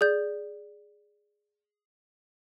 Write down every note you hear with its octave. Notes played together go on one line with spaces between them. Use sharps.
G#4 D5 G6